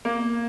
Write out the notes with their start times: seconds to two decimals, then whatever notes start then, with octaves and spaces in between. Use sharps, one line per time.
0.05 A#3